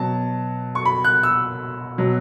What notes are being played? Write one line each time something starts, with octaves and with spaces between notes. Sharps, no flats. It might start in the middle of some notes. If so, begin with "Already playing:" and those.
Already playing: B2 F#3 A5
C#6
B5
F#6
E6
B2 F#3